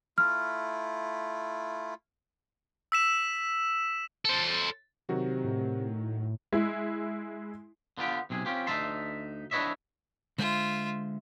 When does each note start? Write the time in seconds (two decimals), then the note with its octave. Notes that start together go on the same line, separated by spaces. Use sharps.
0.18 A3 E4 F4 F6
2.92 E6 B6 E7
4.25 A4 C5
5.09 C3 D#3 F#3 F#4
5.44 A2
6.52 G#3 E4
7.98 D3 B3 F4 G4
8.30 B1 C3 G#4
8.46 C4 C#4 F4 G4
8.67 D2 D#4 E5 A5 C6
9.51 D4 E4 B4 C#5 D#5 E5
10.38 D3 G#3 F4 C5 E5